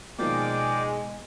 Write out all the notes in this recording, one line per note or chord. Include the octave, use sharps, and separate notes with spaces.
B2 D#3 F3 G#3 A#3 D5 G5 D6